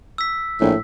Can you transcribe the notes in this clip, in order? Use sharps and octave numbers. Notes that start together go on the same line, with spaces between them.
E6 B6
A#1 A2